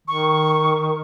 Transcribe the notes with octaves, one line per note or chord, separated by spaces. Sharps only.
D#3 C#6